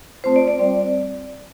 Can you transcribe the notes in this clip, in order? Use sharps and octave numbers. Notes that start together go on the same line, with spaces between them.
A3 C4 F4 C5
D5
D5
G3 C4 F4